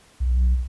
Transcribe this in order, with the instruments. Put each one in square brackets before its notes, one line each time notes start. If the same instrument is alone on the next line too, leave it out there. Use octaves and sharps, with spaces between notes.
[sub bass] B1